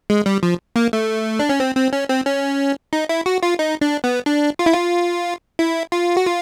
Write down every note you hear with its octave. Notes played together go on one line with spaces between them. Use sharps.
G#3
G3
F3
A#3
A3
D4
C#4
C4
C4
C#4
C4
C#4
D#4
E4
F#4
F4
D#4
D4
B3
D4
F4
E4
F4
E4
F4
F#4
F4